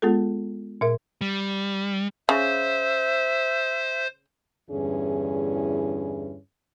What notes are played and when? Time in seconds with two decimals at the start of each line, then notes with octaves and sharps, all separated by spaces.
0.02 G#3 B3 F4 G#4 A4
0.81 A#2 A#4 E5
1.21 G3
2.29 C#3 C5 E5
4.70 E2 G2 D3 C#4 E4 G#4